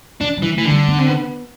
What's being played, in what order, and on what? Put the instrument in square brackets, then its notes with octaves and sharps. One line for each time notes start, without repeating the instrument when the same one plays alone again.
[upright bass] E3 [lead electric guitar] D4
[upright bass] G3
[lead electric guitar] E3
[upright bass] A3
[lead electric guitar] E3
D3
[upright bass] G3
B3
C4
B3